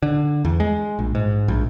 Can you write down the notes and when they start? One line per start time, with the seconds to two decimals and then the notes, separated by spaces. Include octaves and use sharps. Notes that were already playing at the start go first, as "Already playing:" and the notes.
0.03 D3
0.45 E2
0.60 G#3
0.99 A#1
1.15 G#2
1.48 A#1